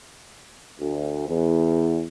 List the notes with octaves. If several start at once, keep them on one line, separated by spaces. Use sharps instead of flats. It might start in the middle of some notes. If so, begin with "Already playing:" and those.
D2
E2